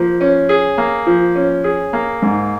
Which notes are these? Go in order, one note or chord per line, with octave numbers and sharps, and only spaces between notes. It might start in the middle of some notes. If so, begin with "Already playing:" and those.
Already playing: F3 A#3
C#4
G#4
A#3
F3
C#4
G#4
A#3
G#2